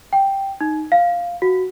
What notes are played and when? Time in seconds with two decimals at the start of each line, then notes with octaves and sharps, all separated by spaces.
0.13 G5
0.61 D#4
0.92 F5
1.42 F#4